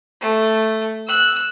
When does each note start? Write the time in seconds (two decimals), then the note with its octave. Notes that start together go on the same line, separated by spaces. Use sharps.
0.21 A3
1.07 E6 F#6